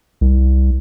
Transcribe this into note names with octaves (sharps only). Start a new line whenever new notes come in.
C2